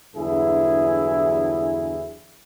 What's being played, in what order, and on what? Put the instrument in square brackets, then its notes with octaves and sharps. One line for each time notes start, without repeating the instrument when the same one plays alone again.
[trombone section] E2 G2 D3 F#3 E4 G#4